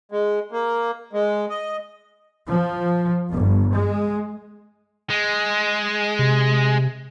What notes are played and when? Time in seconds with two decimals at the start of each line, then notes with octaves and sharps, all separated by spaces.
0.12 G#3
0.52 A#3
1.13 G#3
1.50 D#5
2.48 F3
3.31 G1
3.73 G#3
5.10 G#3
6.19 C3